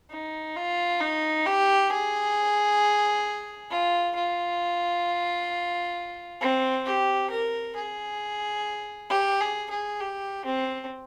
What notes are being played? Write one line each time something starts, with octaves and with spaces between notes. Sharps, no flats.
D#4
F4
D#4
G4
G#4
F4
F4
C4
G4
A#4
G#4
G4
G#4
G#4
G4
C4